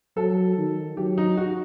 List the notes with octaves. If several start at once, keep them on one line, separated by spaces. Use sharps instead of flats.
F#3 A4
D#3
F#3 G4
D#4
F#4